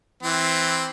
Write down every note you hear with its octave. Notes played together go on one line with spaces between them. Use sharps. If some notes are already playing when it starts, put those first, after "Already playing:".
E3 C4